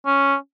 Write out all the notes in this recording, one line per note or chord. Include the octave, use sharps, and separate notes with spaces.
C#4